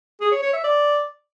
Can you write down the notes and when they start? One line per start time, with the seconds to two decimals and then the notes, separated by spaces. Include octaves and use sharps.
0.21 G#4
0.32 C#5
0.43 C#5
0.53 E5
0.64 D5